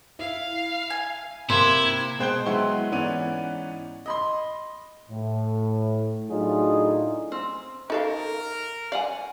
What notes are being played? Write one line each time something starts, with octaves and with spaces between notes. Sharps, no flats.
E4 F5
G#5
C3 A#3 E4 C5 G#6
B2 G#3 C5 G5 F#6 G7
F#3 G#3 B3 E4 C6 C#6
G#2 E3 B3 C#4 D5 D#7
D#5 B5 C6
A2
A2 F#3 D4 D#4 F4 G#4
C4
D#4 A4 A#4 F5
D5 F5 F#5 G#5